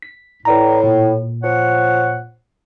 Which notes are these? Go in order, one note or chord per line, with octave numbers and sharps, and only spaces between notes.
B6
A2 B4 D5 A#5
A#2
F3 C#5 F#5